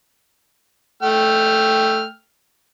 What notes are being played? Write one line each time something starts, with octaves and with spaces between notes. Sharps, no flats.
A3 G5 F6